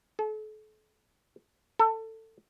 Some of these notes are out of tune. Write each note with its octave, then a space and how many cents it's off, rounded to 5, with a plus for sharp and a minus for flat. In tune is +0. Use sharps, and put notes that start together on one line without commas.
A4 -40
A4 +20